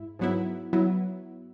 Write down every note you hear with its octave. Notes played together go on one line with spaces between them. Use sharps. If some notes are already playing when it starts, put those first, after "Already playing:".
Already playing: G#2 E4
G#2 F#3 B3 E4
F#3 B3 E4